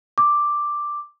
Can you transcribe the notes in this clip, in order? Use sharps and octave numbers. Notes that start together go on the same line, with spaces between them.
D6